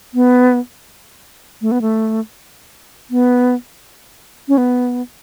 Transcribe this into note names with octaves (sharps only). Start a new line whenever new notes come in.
B3
A3
B3
A3
B3
C#4
B3